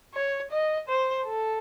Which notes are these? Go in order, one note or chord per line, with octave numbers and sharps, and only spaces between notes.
C#5
D#5
C5
A4